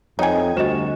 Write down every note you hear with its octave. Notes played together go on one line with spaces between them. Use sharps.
F2 D#4 C#5 D#5 G5 G#5
D2 G3 F#4 C5 D#5 E7